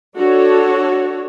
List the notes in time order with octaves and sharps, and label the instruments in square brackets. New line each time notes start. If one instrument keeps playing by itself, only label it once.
[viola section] D4 F#4 A4 C#5